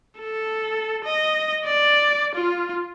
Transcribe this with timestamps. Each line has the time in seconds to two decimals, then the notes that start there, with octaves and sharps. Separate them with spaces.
0.19 A4
1.05 D#5
1.65 D5
2.35 F4